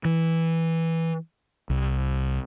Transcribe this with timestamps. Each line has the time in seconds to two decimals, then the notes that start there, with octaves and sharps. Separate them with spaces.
0.05 E3
1.70 C2